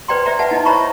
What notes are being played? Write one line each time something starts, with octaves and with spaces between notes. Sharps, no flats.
B4 C5 D5 G5 A#5 C6
C5 D5 E5 G5 A#5
B4 E5 F#5 A5
D#4 E4 D#5 A5
C5 C#5 E5 A#5 B5 C#6